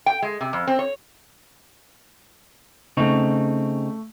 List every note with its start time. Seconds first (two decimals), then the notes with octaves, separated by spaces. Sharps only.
0.06 G5
0.22 G#3
0.41 C3
0.53 F2
0.67 C4
0.79 C#5
2.97 C#3 A3 C4 D#4 C#6